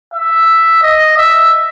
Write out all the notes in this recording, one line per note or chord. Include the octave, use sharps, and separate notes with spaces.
E5
D#5
E5